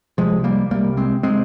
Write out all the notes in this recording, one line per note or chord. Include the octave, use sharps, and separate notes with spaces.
C2 C3 F3 G#3
G3 A#3
C2 C3 G3 A#3
G#3 C4
C3 G#3 C4